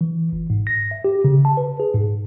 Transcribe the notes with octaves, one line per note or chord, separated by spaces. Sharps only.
E3
G1
G#2
A#6
E5
G4
C#3
A5
B4
G#4
G#2